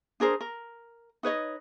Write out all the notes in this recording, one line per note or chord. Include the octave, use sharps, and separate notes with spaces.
D4 G#4 A#4 C5
A#4
D#4 B4 C#5 D#5